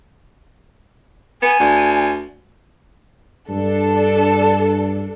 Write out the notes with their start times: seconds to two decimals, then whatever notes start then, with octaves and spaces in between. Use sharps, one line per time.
1.42 B3 G#5
1.60 D2
3.50 G2 D4 A4